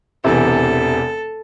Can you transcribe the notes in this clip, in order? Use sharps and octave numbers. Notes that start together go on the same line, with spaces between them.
E1 E2 C3 E3 A4